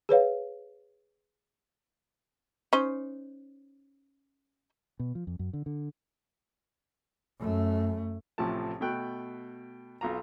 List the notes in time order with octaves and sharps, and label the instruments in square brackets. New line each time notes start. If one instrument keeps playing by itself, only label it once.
[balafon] G#4 B4 C#5 F5
[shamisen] C#4 D#4 C5
[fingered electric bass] B2
F3
F2
F#2
D3
D3
[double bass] F#2 A3
[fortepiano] A1 A2 C3 F3 A5
B2 A3 G5 F#6
B1 F4 A#5